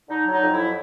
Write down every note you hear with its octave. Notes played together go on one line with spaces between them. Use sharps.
D3 D#4
F#3
D#4
F2
E4
F#3